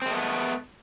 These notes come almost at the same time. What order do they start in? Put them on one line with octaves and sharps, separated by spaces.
C4 G#3 A3 B3